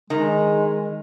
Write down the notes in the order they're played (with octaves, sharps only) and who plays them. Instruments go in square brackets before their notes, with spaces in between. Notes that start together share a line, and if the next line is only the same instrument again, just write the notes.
[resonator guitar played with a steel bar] D#3 [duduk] G#3